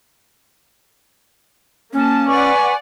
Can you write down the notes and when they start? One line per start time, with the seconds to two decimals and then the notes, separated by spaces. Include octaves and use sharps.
1.93 A#3 C#4 A5
2.28 B4 D5 F#5 G#5 C#6